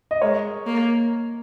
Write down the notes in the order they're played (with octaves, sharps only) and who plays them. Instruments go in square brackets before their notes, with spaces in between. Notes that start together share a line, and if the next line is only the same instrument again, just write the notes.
[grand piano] D#5
[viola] G#3 [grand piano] A#4 C#5
[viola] A#3